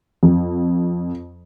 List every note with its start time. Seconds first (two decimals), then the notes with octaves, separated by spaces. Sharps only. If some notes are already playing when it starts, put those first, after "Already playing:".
0.23 F2